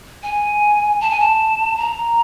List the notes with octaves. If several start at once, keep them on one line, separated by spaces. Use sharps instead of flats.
G#5
A5
G#5
A5
A#5